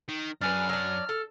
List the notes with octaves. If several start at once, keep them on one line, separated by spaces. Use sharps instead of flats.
D#3
F#2 D4 G#4 B4 F6
F#3 D4
A4